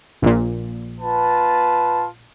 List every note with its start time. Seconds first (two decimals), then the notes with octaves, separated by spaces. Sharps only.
0.22 A#1 A#2
1.01 F4 B4 A5